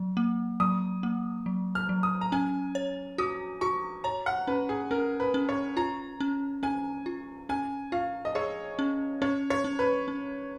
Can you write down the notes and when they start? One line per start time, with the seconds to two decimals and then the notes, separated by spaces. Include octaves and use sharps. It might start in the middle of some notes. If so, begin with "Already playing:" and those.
Already playing: F#3
0.17 A#3
0.60 F#3 D#6
1.03 A#3
1.46 F#3
1.75 F6
1.89 F#3
2.03 D#6
2.21 A#5
2.32 C#4 G#5
2.75 C#5
3.18 F#4 D#6
3.61 F#4 C#6
4.04 C#5 A#5
4.26 F#5
4.47 C#4 B4
4.69 G#4
4.91 C#4 A#4
5.20 B4
5.34 C#4
5.49 C#5
5.77 F4 A#5
6.20 C#4
6.63 C#4 G#5
7.06 F4
7.49 C#4 G#5
7.92 F4 F5
8.25 D#5
8.35 G#4 C#5
8.79 C#4
9.22 C#4 C#5
9.50 C#5
9.64 C#4
9.79 B4
10.08 C#4